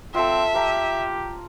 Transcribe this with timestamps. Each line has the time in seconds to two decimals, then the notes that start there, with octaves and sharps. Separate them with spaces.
0.14 C4 F4 A4 E5
0.55 G4 F5 A#5